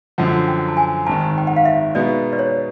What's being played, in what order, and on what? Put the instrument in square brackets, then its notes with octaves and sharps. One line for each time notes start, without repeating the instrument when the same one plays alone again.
[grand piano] F#2 D3 F3 [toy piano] F#5
[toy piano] G5
A5
G#5
[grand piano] G#1 G#2 D#3 [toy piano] A5
[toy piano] G5
F#5
F5
E5
[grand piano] B2 G#3 B3 D#4 [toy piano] D5
[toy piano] D5
C#5